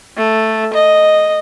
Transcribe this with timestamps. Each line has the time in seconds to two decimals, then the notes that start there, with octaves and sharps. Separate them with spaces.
0.17 A3
0.74 D#5